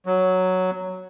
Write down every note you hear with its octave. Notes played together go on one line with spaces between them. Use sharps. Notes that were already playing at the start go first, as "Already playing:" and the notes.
F#3